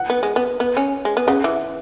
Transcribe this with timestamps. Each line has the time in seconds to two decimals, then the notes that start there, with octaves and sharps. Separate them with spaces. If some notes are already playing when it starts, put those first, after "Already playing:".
Already playing: F#5
0.10 B3
0.23 G#3
0.36 B3
0.60 B3
0.77 C#4
1.05 G#3
1.17 B3
1.27 C#3 F#5
1.44 E3